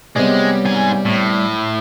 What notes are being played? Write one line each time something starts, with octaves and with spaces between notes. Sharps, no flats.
C3 G3 G#3 B3 C#5 D5
G#2 G#5
A2